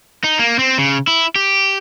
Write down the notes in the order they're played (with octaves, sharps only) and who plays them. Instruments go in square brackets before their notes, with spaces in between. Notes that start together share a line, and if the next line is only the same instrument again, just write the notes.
[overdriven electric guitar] D#4
A#3
C4
C#3
E4
G4